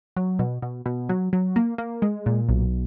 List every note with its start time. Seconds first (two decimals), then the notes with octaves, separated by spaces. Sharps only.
0.16 F#3
0.39 B2
0.62 B2
0.86 B2
1.09 F#3
1.33 F#3
1.56 A#3
1.78 A#3
2.02 G#3
2.26 A#2
2.49 B1